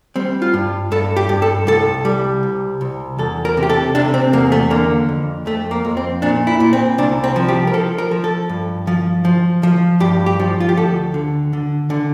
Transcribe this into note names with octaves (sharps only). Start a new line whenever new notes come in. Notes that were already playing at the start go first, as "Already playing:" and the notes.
G3 C4
F4
G2
G2 A4
G4
G2
A4
C2 A4
G3
C2
C2
E2 A4
A#4
C3
G4
A4
C3 D4
C4
E2 A#3
A3
D3 A#3
F2
F2 A3
A#3
F2
C4
A#2 D4
E4
A#2
C4
C2 D4
C4
F3
G4
A#4
F3 A4
A#4
F3
A4
G2
F3
F3
F3
G2 G4
G4
F3
F4
G4
D2 A4
D3
D3
D3